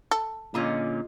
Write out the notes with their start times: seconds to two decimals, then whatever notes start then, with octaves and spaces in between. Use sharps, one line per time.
0.11 A4
0.54 A#2 D3 G#3 C#4 F4 D#5